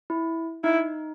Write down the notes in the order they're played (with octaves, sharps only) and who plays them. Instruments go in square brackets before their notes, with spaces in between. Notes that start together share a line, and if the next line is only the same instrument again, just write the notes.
[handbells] E4
[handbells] D#4 [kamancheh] E4